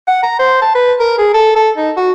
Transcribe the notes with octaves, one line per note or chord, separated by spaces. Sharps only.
F#5
A#5
C5
A5
B4
A#4
G#4
A4
A4
D#4
F#4